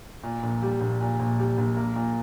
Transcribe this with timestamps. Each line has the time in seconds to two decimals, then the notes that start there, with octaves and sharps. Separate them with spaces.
0.24 A#2
0.43 A#1
0.63 G3
0.81 A#1
1.01 A#2
1.20 A#1
1.39 G3
1.58 A#1
1.77 A#3
1.96 A#2